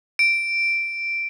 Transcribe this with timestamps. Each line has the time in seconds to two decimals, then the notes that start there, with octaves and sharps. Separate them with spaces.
0.19 D7